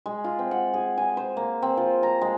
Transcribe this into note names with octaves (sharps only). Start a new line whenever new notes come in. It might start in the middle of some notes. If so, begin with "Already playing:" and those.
G#3
F4
C4
F#5
G#4
G#5
C5
A#3
C4
F3
A#5
G#3